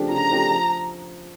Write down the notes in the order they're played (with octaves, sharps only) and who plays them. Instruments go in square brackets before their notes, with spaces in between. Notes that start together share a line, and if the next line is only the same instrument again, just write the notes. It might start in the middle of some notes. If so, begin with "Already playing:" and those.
Already playing: [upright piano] C#3 F3 A3 D4 G4
[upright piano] C#3 [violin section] A#5
[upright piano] F3 A3 D4 G4
F3